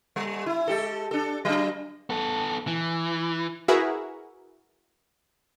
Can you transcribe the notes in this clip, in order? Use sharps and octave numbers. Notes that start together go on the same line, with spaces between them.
G3
E4
G#3 G4 A4
D4 A4
F#3 D4
B3 A4
E3
E4 F#4 G#4 A#4 B4 E5